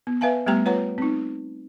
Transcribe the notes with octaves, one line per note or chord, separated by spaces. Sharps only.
B3
B4 E5 F5 G#5 A5
G3 A3 B3 G4 G5 A#5
F4 B4 C#5 F#5 A#5
C4 D#4